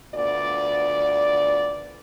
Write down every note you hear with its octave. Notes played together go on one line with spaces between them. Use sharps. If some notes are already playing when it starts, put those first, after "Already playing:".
D2 B3 F4 D5